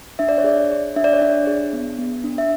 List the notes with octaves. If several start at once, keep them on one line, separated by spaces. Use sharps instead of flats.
D4 E5
D5
C#5
G#4 D5
G#4
D4 E5
D5
C#5
D4 D5
G#4
B3
B3
D4
E5